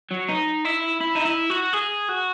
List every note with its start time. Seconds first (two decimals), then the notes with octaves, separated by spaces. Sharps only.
0.11 F#3
0.29 D#4
0.65 E4
1.01 E4
1.15 D#4
1.25 E4
1.50 F#4
1.73 G#4
2.09 F#4